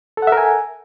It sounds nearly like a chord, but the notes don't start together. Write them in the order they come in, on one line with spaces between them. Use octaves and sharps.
A4 F#5 E5 A#4 G#5